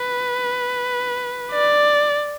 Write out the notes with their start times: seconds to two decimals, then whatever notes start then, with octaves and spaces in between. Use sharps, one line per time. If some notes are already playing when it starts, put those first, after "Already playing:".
Already playing: B4
1.52 D5